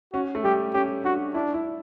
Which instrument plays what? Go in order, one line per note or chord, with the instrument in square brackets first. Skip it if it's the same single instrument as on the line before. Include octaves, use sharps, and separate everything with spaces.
[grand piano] C#4 [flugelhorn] F#4
[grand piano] A3
[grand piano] G3 [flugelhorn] G4
[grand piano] C#4 [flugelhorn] G4
[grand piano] D4 [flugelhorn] F#4
[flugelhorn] D4 [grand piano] E4
[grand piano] E4